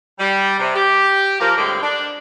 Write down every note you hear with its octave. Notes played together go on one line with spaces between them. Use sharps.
G3
C3
G4
F3 A#3 A#4
A2 D3 G3 G#3 C4 G4
D4